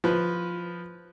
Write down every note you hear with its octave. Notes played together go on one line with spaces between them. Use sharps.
F3 B4